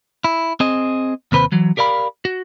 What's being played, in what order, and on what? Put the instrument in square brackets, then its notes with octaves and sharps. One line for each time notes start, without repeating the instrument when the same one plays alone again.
[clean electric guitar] E4
C4 G#4 D#5
D#2 C3 B4 C5 B5
E3 F#3
G4 A#4 D5 F5 B5
F#4